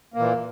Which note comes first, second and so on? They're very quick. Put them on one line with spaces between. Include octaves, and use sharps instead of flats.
A#3 A#2 E3